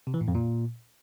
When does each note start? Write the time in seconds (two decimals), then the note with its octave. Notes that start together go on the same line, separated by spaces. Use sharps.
0.07 C3
0.14 E3
0.21 A2
0.28 F2
0.35 A#2